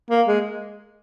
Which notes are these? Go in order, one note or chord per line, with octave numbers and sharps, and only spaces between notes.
A#3
G#3